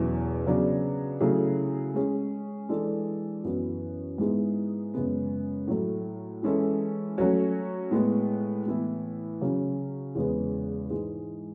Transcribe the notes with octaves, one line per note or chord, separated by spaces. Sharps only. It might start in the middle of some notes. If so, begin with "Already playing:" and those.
Already playing: E2 B2 F#3 C#4 E4
C#3 F#3 B3 D4
C#3 F#3 A3 E4 G#4
G#3 C#4 G#4
E3 G#3 D4 A4
F#2 E3 B3 F#4 B4
G#2 G#3 B3 E4 G#4
F#2 C#3 G#3 B3
A2 F#3 A3
E3 G#3 C#4 E4 A4
F#3 A3 C#4 F#4 C#5
A2 G#3 B3
A2 E3 B3 E4
C#3 F#3 C#4
E2 C#3 G#3 B3
G#2 E3 G#3